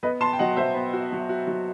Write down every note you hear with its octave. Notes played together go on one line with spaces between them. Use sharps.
B3 B4 D#5
B3 A5 C6
G5
F#3 D#5 F#5
F#3 C5 E5
B3
F#4
F#3
F#4
F#3